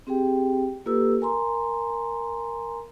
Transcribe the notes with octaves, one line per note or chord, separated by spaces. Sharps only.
C4 G4 G#4 G5
A#3 F4 G4 A4 B4 E6
A#4 G#5 A#5 C6